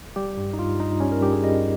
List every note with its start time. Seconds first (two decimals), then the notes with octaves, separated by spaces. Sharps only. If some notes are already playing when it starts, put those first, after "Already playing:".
0.16 G3 G4
0.37 G2
0.53 D#4
0.58 G2 F4
0.79 G2 D#4
1.00 G3 C#4
1.12 A#4
1.21 G2 G4
1.33 G#4
1.43 G3 D#5